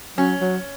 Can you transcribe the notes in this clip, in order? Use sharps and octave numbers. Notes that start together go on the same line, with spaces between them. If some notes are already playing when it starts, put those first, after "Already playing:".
F#3 C#4
F#3